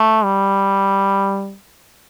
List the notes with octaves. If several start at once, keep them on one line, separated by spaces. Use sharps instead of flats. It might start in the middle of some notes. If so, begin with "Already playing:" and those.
Already playing: A3
G3